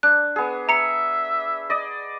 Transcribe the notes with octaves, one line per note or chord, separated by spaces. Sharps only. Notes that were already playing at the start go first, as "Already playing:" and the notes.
D4 F#6
B3 G#4
E5 A#5 C#7
D5 D#5